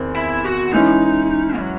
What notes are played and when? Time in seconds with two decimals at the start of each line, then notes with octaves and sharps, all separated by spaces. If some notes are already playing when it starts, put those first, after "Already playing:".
Already playing: E2 D#3 C4
0.16 E4
0.44 F#4
0.72 E3 G#3 C#4 D#4 E4
1.58 F#3